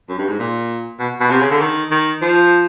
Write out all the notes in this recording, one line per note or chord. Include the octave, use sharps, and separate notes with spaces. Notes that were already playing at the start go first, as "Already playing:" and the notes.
F#2
G2
G#2
A#2
B2
B2
C3
C#3
D3
D#3
D#3
F3